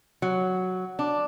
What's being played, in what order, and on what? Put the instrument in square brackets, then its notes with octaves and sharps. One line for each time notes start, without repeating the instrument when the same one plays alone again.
[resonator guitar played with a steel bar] F#3
D4